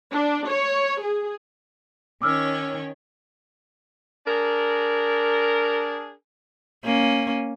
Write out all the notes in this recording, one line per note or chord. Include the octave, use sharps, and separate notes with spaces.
D4
C#5
G#4
D#3 C#4 C#5 D6 E6 F6
D4 G#4 A#4
A#3 C#4